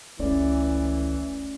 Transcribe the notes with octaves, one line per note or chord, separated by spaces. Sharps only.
F#1 C#2 E3 A3 C#4 D5